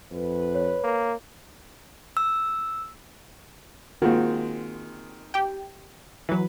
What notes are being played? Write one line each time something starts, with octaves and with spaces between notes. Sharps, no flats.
F2 B4
C#5
A#3
E6
D#3 G#3 A#3 C4 F4 F#4
G4 G5
E3 F#3 B4